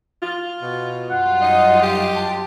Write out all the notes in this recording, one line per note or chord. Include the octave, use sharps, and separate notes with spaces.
F4
B2
F#2 G3 F4 F#5
D#4 D#5
G4
A5